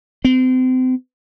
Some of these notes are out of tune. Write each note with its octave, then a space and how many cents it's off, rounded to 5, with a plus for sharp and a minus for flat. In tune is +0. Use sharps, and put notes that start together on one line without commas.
C4 -35